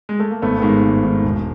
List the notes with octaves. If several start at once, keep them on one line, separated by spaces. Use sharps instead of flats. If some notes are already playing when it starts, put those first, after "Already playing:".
G#3
A3
A#3
G#1 A3 B3
B3
G#2 D#3 G#3 A#3
G#1
G#2 D#3
E1